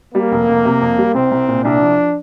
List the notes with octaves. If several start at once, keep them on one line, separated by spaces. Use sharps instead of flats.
G3 A#3
F1
F1
C3
F2
G3
C2 C4
C2
A#2
C2 D4
F3